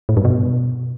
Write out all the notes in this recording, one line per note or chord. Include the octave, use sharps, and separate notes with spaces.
A2
G2
B2